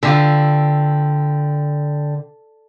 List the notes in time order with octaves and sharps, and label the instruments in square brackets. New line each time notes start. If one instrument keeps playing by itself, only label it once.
[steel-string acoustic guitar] D3 [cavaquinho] F4 G4 E5